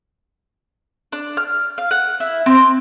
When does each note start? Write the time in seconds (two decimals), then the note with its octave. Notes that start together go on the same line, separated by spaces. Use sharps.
1.12 D4
1.37 F6
1.78 F5
1.91 F#5
2.20 E4
2.46 C4